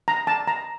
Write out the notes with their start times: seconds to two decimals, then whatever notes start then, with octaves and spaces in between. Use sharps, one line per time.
0.08 A#5
0.27 A5
0.47 A#5